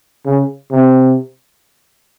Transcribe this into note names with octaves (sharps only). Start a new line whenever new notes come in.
C#3
C3